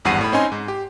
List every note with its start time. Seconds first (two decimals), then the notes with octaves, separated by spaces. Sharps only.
0.05 G#1 E2 G2 F#5 C7 D#7
0.21 A2 B5
0.32 C4 C#4 D#4 D#5 G#5 C6
0.52 G#2
0.68 G4